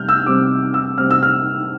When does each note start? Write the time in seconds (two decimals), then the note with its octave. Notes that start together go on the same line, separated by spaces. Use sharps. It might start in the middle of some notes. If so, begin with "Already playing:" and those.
Already playing: C3 G3 C4 F6 G6
0.09 E6
0.26 C3 G3 C4 D6
0.74 E6
0.98 C3 G3 C4 F6
1.11 E6
1.23 F6